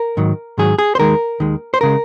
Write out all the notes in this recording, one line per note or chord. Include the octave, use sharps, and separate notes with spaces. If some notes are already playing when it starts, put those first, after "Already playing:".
Already playing: A#4
G#2 D#3 F#3
G#2 D#3 F#3 G#4
G#4
C5
D#2 D#3 G#3 A#4
D#2 D#3 G#3
C5
C#3 G#3 A#4